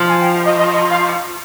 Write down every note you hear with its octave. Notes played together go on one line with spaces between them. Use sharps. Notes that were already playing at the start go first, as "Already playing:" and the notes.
Already playing: F3
G#5
G5
D#5
D#5
D#5
F5